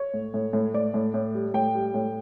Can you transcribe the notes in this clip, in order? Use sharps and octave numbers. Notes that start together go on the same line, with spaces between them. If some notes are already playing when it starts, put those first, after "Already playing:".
Already playing: C#5
A2
A2
A2
A2 D5
A2
A2
G3
A2 G5
G3
A2